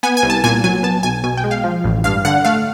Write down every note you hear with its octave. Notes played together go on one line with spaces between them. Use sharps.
B3 G#5
G#5
C2
A5
A#2 G#5
F#3 G#5
B3 A5
B1 G#5
B2 G#5
G5
G#3
F5
F3
A1
G2 F5
D3 F#5
A3 F5